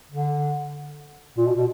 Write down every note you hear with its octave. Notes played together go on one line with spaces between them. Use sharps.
D3
A#2
B2
B2